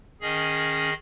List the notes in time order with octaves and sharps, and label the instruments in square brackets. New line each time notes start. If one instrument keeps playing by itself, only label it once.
[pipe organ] D#3 C#4 G#4 D#5